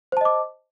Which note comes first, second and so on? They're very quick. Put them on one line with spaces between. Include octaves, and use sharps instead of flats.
C5 A5 D#5 D6